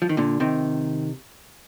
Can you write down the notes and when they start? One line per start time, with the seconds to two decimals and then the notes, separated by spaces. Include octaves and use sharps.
0.02 F3
0.09 D#3
0.17 A#2 D3
0.40 C3 D#3